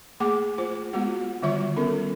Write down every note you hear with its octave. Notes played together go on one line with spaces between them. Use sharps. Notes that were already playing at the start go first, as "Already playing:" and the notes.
A3 A#3 G#4 F#5 D6
F4 C5
G#3 B3 F4 F#4 F#5
D3 D#3 G3 F4 E5 C#6
B3 C#4 A4 A#4